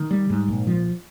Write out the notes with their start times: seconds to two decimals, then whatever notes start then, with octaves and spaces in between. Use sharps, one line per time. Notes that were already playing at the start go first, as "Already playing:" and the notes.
Already playing: D#3
0.11 G3
0.30 G#2
0.48 A#1
0.67 F3